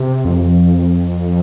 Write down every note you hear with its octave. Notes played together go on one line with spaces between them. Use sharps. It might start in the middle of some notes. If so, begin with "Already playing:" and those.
Already playing: C3
F2